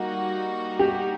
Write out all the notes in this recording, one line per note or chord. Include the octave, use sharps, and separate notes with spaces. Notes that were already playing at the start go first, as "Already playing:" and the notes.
Already playing: G3 A#3 D#4 F#4
G4